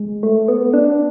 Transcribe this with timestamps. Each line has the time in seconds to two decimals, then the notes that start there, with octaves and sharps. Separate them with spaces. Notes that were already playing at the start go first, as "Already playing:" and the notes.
Already playing: G#3
0.23 A3
0.48 B3
0.74 D4